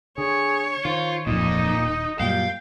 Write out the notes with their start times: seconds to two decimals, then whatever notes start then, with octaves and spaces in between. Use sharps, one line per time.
0.18 D3 G#4 C#5
0.85 D#3 F4 C5
1.27 D1 F2 A#2 D#4 D#5
1.77 D#1
2.20 F#2 A#2 G3 F5 G5